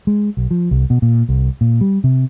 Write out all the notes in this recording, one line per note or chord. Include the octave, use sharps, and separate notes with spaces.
G#3
B1
F3
C2
B2
A#2
C2
A#2
G3
C3